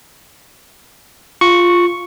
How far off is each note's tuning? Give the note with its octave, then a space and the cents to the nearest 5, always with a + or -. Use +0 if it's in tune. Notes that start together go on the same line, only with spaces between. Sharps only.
F4 +0 C#6 +0